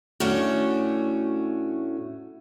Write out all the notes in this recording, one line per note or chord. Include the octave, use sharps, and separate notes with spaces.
A2 A3 C#4 D4 F#4